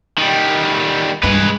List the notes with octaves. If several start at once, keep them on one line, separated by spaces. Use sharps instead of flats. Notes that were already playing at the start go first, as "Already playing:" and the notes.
D#3 G3
E2 G2 G#3 B4